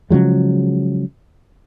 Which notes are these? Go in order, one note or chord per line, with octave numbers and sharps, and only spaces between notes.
C#3 F3 F#3 G#3